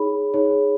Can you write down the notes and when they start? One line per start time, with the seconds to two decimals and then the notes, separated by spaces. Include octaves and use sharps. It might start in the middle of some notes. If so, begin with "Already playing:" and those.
Already playing: D#4 G#4 C#5 B5
0.34 D#4 G#4 C#5